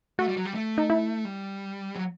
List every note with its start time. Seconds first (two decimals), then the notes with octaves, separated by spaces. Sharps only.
0.19 A3 F#4
0.28 G3
0.37 F#3
0.45 G3
0.54 A3
0.78 D#4
0.90 E4
1.25 G3
1.95 F#3